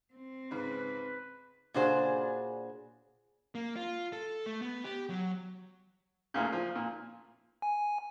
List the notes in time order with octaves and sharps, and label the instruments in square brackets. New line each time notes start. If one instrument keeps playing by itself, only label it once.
[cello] C4
[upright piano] G#2 C#3 [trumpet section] B4
[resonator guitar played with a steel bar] A#2 C#3 D4 F#4 G#4 C5
[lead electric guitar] A#3
F4
A4
A3
B3
G4
F#3
[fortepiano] D2 A#2 C#3
F3
A#2
[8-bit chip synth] G#5